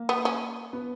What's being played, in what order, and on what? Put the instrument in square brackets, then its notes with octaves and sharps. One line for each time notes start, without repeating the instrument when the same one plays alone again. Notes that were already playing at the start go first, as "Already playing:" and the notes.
Already playing: [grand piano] A#3
[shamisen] B3
C#4
[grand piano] B3